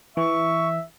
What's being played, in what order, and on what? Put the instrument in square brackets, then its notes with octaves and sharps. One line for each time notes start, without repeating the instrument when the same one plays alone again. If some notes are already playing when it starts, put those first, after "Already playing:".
[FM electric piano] E3 [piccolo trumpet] E5 [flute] C#6